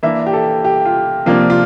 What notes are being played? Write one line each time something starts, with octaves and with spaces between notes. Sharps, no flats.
E3 A#3 D4 E5
G4
A4
G4
F4
C3 F3 A#3 D4 F4
F4